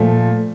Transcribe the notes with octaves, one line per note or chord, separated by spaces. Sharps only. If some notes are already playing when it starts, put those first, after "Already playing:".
Already playing: A#2 F3 A3